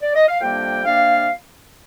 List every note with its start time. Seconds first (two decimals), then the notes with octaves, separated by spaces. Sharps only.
0.02 D5
0.15 D#5
0.28 F5
0.41 F2 C3 G3 A#3 D4 G5
0.85 C3 G3 A#3 D4 F5